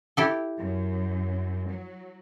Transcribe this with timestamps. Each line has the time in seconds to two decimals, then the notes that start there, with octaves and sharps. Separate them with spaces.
0.17 E4 G4 A4
0.59 F#2
1.69 F#3